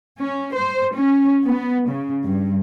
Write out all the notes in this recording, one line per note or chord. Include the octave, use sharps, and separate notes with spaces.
C#4
C5
C#4
B3
C#3
G2